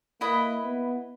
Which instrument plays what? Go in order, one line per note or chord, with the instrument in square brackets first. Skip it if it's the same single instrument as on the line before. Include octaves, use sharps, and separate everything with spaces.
[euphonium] A#3 [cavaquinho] E4 B4 D#5
[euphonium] B3